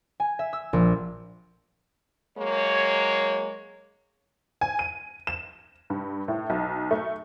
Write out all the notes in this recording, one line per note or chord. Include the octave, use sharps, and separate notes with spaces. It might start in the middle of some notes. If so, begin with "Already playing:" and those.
G#5
E5
E6
A#1
F#3 G#3 A#3 C#5
G#5
D#7
E7
G2
A2
B1
A3